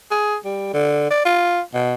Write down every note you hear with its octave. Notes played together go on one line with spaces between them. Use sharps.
G#4
G3
D3
D5
F4
B2